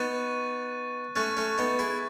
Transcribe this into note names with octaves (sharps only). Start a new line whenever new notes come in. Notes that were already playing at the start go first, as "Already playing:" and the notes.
Already playing: B3 D#4 C#6 F#6 A6 D#7
A3 C#4 C#6 F#6 A6
A3 C#4
B3 D#4
E4 G#4